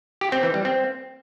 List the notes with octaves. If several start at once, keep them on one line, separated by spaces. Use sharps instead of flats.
G4
C4
E3
G3
C4